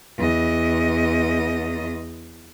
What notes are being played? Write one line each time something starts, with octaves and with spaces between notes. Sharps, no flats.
E2 D#5